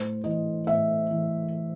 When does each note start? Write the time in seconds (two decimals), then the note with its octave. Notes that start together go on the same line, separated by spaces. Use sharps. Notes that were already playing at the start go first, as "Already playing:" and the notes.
Already playing: A2 C5
0.24 E3 D#5
0.67 A2 E5
1.11 E3